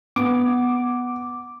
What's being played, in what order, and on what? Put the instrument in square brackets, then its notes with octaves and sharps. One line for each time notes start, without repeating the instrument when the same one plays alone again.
[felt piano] B3 [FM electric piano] D6